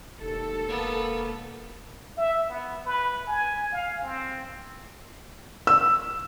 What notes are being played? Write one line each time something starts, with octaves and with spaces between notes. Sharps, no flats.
E1 D#2 A4
A#3 B3
E5
B3
B4
G#5
F5
C4
E6